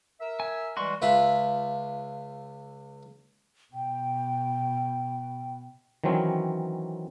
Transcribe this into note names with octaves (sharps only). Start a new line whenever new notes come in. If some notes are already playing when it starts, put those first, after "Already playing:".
A#4 E5
G#5
E3 G3 G#3 F#4 C6 C#6
C#2 F4 E5 F#5 B5
B2 G5
D#3 E3 F#3 C4 C#4